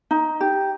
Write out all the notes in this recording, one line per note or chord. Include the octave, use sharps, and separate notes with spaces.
D#4
G4